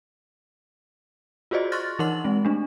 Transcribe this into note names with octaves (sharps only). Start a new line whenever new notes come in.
F4 F#4 G#4 C5 D5 D#5
C6 C#6 F6 F#6 A6 A#6
E3 D#4 A#4 F#5 C6 F#7
G#3 C4
A3 D4